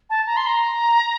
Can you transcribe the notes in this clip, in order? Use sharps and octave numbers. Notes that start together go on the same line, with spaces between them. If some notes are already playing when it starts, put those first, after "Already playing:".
A5
A#5
C6
A#5